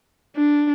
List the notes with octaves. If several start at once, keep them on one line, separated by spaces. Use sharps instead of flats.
D4